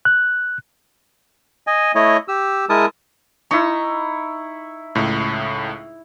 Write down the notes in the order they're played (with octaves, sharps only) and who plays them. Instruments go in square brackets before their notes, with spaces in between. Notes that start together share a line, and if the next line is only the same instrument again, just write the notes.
[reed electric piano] F#6
[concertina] D#5 G#5
A3 E4 C#5 D#5
G4 E6
G#3 E4 A#4 A5 D#6
[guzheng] D#4 [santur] E4 C#6
[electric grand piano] C#2 A2